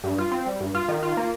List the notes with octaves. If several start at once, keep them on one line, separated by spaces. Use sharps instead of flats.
G2
F4
C4
G3
G2
F4
D#3
F4
A#3